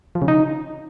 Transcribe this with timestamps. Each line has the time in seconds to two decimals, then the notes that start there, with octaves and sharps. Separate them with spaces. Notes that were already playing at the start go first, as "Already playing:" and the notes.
0.15 F3
0.22 C#3
0.28 D#4